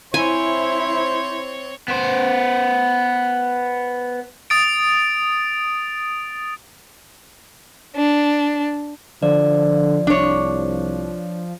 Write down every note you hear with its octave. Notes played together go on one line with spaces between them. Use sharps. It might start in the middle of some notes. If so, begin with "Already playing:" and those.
C4 E4 C5 C#5 G#5
B3 C5
D#6 A6 D7
D4
D3 F3 D5
C2 D4 C#5